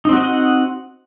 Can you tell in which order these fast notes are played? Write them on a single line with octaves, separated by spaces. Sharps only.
D#4 C4 F#4 D#5 F#5